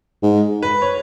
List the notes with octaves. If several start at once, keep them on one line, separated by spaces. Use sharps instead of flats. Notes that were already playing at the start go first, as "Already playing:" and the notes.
G#2
B4
C#5